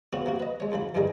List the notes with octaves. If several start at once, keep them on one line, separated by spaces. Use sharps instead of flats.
C#3 B3 C#4 F#4
C3 A#3 F#4
B4 D#5
G#3 C#5
C2 C#3 F#3 B5
C2 G2 D#3 G3 G#4 A#4